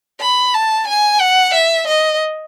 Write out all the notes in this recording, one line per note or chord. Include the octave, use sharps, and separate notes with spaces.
B5
A5
G#5
F#5
E5
D#5